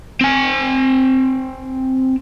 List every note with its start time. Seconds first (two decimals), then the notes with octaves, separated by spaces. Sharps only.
0.21 C4 G#5